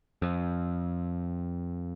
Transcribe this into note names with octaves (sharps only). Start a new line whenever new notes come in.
F2